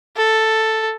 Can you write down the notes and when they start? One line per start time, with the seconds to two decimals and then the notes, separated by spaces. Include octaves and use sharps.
0.17 A4